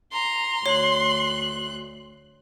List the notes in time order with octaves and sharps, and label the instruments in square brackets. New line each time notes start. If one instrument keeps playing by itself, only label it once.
[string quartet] A#5 [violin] C6
[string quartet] D2 F#6 [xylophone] C#5